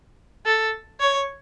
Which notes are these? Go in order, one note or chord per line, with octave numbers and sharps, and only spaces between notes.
A4
C#5